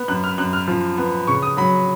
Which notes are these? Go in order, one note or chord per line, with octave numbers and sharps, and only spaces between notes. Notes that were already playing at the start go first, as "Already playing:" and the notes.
Already playing: B3
F#2 F#6
F6
F#2 F#6
F6
F3
B3
C#3 C#6
D#6
F#3 B5